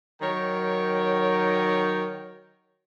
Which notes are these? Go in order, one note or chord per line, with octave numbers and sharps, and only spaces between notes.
D#3 F#3 A#4 C#5 G5